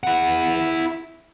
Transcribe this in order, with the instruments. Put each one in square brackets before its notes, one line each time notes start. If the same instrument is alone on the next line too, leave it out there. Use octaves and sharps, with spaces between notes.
[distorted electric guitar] E4 F#5